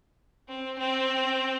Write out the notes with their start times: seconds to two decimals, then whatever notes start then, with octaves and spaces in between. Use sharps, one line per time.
0.48 C4
0.79 C4